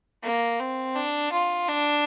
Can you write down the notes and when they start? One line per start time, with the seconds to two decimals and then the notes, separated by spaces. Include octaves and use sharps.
0.23 A#3
0.60 C4
0.96 D4
1.32 F4
1.69 D4